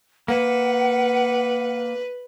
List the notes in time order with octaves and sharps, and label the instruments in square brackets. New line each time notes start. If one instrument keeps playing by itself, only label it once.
[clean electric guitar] A#3 [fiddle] B4 [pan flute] F#5